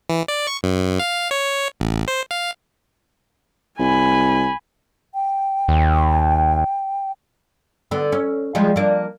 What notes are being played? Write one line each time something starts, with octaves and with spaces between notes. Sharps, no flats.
E3
D5
C#6
F#2
F5
C#5
A1
C5
F5
C2 G#5 B5
G5
D#2
D3 B3
C#4
F3 G3 G#3
A#3 D4